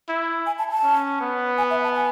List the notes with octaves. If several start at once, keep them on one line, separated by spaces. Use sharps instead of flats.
E4
G#5
A5
A5
C#4
B3
G#5
E5
A5
G#5